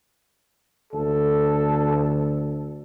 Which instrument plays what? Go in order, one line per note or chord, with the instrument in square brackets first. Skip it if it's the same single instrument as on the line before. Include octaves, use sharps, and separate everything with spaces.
[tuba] D2 [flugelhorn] A4